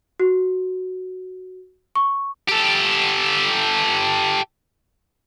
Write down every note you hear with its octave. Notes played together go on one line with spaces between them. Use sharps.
F#4
C#6
G4 A4